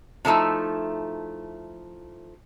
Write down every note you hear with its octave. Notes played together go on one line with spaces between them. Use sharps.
C3 F3 A3 D#4 E4